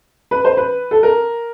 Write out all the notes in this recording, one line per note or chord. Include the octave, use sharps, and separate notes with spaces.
B4
C5
B4
A4
A#4